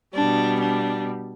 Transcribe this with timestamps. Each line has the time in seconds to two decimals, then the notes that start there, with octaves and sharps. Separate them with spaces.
0.14 B2 G3 D4
0.60 D4